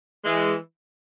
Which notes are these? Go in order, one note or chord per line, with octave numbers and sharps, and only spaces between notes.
E3 G#3